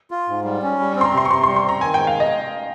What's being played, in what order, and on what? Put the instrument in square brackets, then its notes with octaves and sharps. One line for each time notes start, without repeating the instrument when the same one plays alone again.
[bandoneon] F4
G#2
G3
C#4
G3
C4
[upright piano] C6
A#5
[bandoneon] C3 [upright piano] C6
[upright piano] C#6
[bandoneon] C3 [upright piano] C6
[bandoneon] G3 [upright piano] C6
[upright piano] C6
[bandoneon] C4 [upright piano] A#5
[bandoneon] D#3 [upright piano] G#5
[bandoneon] G#3 [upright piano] G5
[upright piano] F5
[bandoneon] C3 [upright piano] D#5